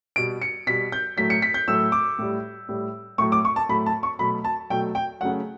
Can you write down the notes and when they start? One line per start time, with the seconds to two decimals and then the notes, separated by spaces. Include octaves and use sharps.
0.16 B2 G3 D7
0.42 C#7
0.67 B2 G3 B6
0.92 G6
1.17 A2 F#3 A3 B6
1.30 C#7
1.42 B6
1.54 G6
1.68 A2 F#3 A3 E6
1.92 D6
2.19 A2 G3
2.69 A2 G3
3.18 A2 F#3 A3 C#6
3.32 D6
3.45 C#6
3.56 A5
3.69 A2 F#3 A3 B5
3.86 A5
4.03 C#6
4.19 B2 F#3 A3 B5
4.44 A5
4.70 B2 F#3 A3 G5
4.95 G5
5.21 C#3 F#3 A3 F#5